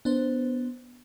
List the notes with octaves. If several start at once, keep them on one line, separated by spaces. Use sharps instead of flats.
B3 D4 C5